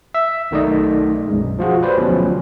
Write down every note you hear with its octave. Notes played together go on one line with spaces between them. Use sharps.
E5
B1 D#3 A3 D#4 D5 D#5
B1 F#2 G#3
F3 F4 F#4 G#4
G4 B4 C5 D5
D2 B2 F3 F#3 C#4